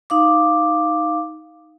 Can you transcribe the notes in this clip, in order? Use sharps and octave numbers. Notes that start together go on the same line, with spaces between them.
D#4 F5 D6